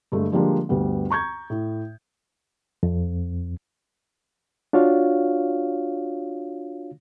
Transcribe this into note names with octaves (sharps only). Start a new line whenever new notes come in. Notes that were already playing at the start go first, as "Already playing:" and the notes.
G2 D3 G#3 A3
D3 F3 G3 G#3 A#3 D4
D2 G2 G3 B3
A#5 C#6 G6 G#6
A2
F2
D4 F4 F#4 C#5 F5